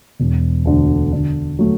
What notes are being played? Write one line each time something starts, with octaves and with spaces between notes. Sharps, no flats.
E1
D2 D3
D3
F#3 A3